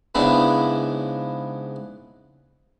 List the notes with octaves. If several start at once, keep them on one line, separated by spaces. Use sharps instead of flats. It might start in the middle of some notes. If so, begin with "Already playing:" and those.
G#2 C#3 B3 D4 E4